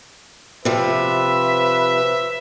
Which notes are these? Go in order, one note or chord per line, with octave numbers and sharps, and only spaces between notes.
C3 F3 B4 E5